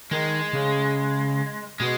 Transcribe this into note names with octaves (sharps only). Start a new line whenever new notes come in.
D#3 G#3
C#3
B2 G#3